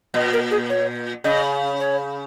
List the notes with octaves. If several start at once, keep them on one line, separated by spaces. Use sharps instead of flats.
A#2 D#5
A#4
G#4
C#5
C#3 D#5
C#5